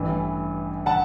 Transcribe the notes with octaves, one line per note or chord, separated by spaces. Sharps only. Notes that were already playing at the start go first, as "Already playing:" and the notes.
Already playing: A1 G2 E3
F#5 A5